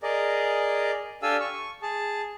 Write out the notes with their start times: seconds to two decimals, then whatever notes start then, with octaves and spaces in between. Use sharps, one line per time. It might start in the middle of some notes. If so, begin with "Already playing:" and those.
0.03 G#4 A#4 D5 D#5
1.23 D4 G4 A4 F5 G#5 E6
1.40 C#6
1.82 G#4 A5